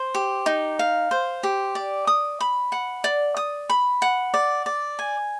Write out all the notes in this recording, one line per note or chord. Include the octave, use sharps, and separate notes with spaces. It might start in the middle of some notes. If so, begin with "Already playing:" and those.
Already playing: C5
G4
D#4
F5
C5
G4
D5
D#6
B5
F#5
D5
D#6
B5
F#5
D5
D5
G#5